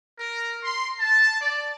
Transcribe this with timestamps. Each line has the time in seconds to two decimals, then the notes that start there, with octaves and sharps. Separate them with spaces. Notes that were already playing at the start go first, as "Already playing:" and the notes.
0.20 A#4
0.64 C6
1.00 A5
1.42 D5